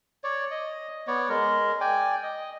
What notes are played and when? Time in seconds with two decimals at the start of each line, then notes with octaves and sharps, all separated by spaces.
0.24 C#5 D5
0.51 D#5
1.07 B3 C#5 D5
1.29 G#3 A#4
1.81 D5 G5 G#5
2.23 D#5